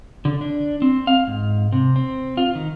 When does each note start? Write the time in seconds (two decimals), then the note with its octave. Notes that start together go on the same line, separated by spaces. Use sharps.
0.25 D3
0.41 D4
0.82 C4
1.07 F5
1.27 G#2
1.72 C3
1.96 C4
2.37 F4
2.55 D#3